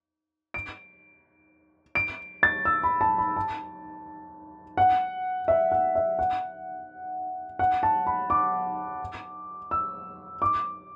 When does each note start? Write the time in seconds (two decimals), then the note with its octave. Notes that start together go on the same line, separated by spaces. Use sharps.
0.54 D7
1.95 D7
2.43 A6
2.65 E6
2.83 B5
3.01 A5
3.18 B5
3.37 A5
4.77 F#5
5.48 E5
5.72 F#5
5.95 E5
6.19 F#5
7.59 F#5
7.83 A5
8.07 B5
8.30 D6
9.71 E6
10.42 D6